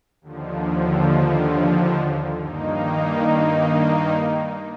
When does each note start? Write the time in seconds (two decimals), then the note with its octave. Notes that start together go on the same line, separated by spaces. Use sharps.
0.21 D#2 D3 F3
2.37 G2 D#3 A#3 D#4